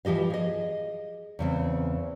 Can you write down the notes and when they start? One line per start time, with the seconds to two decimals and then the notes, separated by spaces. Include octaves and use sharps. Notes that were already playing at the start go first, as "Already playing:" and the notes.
0.05 E3 F3 G4 D#5 F5
0.30 G#4 D#5
1.39 E2 C#3 C4